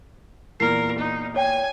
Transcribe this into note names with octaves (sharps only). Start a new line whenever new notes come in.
E2 A#2 A#4 C7
D#4
C#5 G5 G#5